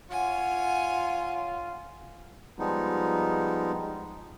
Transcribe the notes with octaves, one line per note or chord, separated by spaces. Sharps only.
F4 C#5 F#5 G#5
F3 G3 G#3 B3 D#4